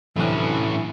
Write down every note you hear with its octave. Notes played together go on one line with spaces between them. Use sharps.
D2 A2 C3 E3 F#3 C#4 G#5 F#6